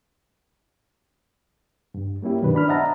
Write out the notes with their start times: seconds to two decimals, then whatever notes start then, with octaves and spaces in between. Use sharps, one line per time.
1.94 G2
2.22 G3 A#3 C#4 E4 G4
2.41 G2 B2 D#3 F#3 D4 B4
2.53 B3 D4 B5 F6
2.68 C5 D#5 E5 F#5 A5 A#5